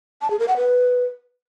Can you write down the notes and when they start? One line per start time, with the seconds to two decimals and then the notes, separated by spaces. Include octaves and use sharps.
0.22 A5
0.30 G#4
0.39 A#4
0.48 F#5
0.57 B4